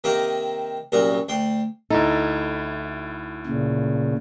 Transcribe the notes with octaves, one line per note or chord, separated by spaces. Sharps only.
C3 D#3 A#3 D#4 A#4 D6
C2 F#2 A#2 F#4 A#4
D2 G5 C6
D2 D#4 E4 A4
A#2 C#3